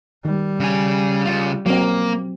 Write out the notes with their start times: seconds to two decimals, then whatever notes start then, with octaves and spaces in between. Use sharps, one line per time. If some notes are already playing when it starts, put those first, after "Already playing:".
0.25 D#3 G3
0.60 C#3 G#5
1.25 C#3 F4
1.66 F#3 A#3 C4